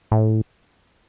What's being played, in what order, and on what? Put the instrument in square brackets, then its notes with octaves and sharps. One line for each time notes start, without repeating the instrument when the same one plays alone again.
[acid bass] A2